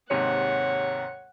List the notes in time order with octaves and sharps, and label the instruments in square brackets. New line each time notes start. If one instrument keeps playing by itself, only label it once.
[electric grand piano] D#2 G#2 C3 [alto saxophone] C#5 [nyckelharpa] F#5